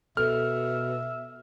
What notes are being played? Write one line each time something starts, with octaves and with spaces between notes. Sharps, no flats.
B2 A4 E5 F6